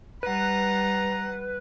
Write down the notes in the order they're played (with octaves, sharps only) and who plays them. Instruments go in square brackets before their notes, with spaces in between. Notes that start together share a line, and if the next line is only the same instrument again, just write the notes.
[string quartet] G3 F#5 [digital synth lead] B4 [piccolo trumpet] A#5